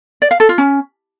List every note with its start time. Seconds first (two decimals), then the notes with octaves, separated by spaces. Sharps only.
0.22 D5
0.31 F5
0.40 A4
0.49 F4
0.58 C#4